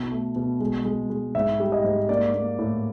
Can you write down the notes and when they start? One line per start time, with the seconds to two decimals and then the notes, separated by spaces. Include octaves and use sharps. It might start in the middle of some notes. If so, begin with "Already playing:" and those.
Already playing: B2
0.11 A3
0.36 B2
0.60 G#3
0.85 G#3
1.10 G#3
1.35 G#2 E5
1.60 G3
1.72 D#5
1.84 G#2
2.09 A#3 D5
2.34 A#3
2.59 A2